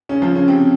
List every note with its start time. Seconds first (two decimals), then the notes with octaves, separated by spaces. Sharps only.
0.09 C#3 C#4
0.22 F3 F4
0.35 C#3 C#4
0.48 C3 C4